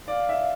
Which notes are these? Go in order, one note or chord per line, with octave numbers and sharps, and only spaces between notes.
D5 F5
E5